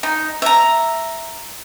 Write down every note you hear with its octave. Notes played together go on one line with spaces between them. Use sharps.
D#4
E5 A#5